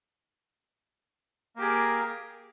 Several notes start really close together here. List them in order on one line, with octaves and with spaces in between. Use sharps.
A#3 G4 G#4 A#4